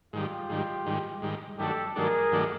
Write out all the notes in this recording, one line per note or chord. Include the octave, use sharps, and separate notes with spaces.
G#2 D#3 G3 F4 G4
G#2 D#3 G3
G#2 D#3 G3
G#2 D#3 G3
G2 D#3 F#3 A3 D4 G4 A4
G2 D#3 F#3 A3 D4 G#4 A#4
G2 D#3 F#3 A3 D4